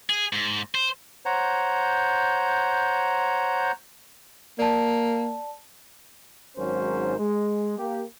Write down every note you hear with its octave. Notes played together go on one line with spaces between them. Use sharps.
G#4
G#2
C5
C5 C#5 F#5 A#5 G6
A#3 D5 A5
G#1 G#2 F#3 C#4 A#4 C5
G#3
A#3 G4